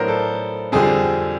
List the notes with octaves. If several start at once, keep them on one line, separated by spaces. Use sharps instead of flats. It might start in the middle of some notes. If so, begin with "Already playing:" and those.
Already playing: A2 F#3 B3 D4 A#4 C5
A4
F2 D3 G3 C4 G#4